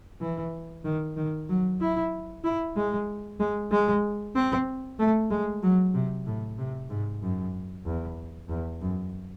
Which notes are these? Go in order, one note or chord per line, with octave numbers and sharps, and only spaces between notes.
E3
D#3
D#3
F#3
E4
E4
G#3
G#3
G#3
C4
A3
G#3
F#3
C3
A2
C3
G#2
F#2
E2
E2
F#2